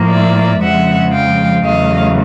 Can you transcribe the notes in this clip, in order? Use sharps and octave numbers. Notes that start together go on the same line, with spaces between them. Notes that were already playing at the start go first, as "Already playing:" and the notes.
Already playing: A2 F3 A#3
D5 E5
F2 C#3 F3 G#3 E5 F#5
F5 G5
E2 C#3 F#3 A3 D#5 F5